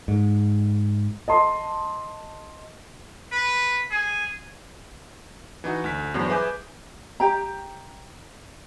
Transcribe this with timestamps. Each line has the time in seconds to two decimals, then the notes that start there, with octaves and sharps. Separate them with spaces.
0.08 G#2
1.28 D#5 A5 C6
3.32 B4
3.91 G#4
5.64 E3 D#4 F#4
5.84 D2 B6
6.14 E2 G2 F#3 C5
6.29 G#4 B4 E5 G#5 D6 G6
7.20 G4 G5 A#5